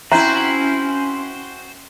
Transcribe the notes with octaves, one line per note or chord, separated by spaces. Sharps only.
C4 C#4 E4 F#4 C5 E5 A#5